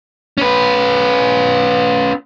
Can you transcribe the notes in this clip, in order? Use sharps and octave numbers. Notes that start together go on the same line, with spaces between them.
C#4 B4